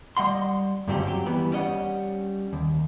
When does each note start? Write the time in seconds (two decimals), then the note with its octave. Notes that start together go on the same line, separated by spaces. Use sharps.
0.17 G3 D#5 F#5 C6
0.87 G2 D3 F#3 C4 C#4 G4
1.07 F#3 G4
1.26 E3 G3 B3
1.52 G3 C#4 D#5 F#5
2.53 D#2